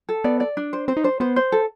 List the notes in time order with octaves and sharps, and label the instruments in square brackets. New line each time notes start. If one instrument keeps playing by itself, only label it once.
[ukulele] A4
[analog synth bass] B3 [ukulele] D5
[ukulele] D5
D4
C5
[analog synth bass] C4 [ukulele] C5
[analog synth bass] D#4
[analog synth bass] D4 [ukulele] C5
[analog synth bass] B3 [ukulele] C5
[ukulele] C5
A4